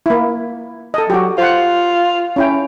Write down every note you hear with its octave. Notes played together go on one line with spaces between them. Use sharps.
A#3 E4
A4 D#5
F#3 F#4 G4
F4 C5 F#5
C#4 E4 G5